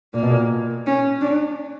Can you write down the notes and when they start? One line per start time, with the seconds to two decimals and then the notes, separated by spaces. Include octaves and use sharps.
0.14 A#2 A#3
0.23 B2
0.30 A#2
0.86 C#4
1.21 D4